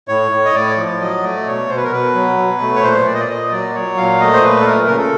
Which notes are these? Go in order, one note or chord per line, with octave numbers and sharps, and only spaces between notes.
A2 C#5
A2
D#5
A2 D5
F3
F#3 D#5
A3 D5
B2 C#5
B2 C5
B4
A#4
B2 B4
F#3
B2
A3
C#5
A#2 C5
A#2 D5
D#5
D5
A#2 D#5
F#3 D5
F#3 C#5
A#2 F5
A3 D#5
C5
A#2 B4
A4
A3 A#4
C#3 A#4
A4